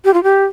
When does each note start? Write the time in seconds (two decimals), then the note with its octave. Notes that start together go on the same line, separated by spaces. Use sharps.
0.05 G4
0.13 F4
0.23 G4